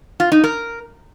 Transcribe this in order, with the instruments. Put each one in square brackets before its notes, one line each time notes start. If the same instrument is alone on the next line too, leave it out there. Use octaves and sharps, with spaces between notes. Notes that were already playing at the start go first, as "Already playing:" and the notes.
[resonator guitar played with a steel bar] F4
D#4
A#4